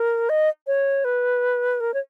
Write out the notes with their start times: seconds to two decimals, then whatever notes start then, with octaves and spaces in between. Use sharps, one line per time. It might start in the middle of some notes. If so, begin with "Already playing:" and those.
Already playing: A#4
0.29 D#5
0.67 C#5
1.04 B4
1.80 A#4
1.94 C#5